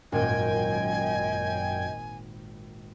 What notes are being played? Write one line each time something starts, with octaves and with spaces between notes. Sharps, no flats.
G#1 F#2 A#2 D#5 G5 G#5 G#6